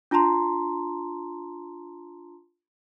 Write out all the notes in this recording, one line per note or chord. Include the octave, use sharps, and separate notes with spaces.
D4 F4 A5 A#5 C6